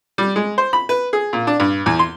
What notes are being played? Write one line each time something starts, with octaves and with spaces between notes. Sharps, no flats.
G3
G#3
C5
B5
B4
G#4
A#2
D4
G2
E2
C6